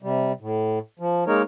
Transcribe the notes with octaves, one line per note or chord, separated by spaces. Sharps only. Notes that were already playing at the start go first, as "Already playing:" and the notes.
C3 G3
A2
F3
G#3 A#3 D#4 A#4 C#5